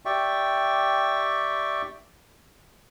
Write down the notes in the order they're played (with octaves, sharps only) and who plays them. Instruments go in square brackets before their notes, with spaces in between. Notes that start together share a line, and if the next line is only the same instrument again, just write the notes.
[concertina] G4 D5 E5 G5 C#6